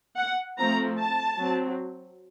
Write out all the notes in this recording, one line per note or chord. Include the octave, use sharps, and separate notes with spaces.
F#5
F3 A3 C4 A#5
A5
F#3 C4